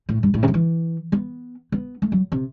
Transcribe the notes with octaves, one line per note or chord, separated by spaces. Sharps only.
A2
G2
A2
C3
D3
E3
B3
B3
A3
F#3
C3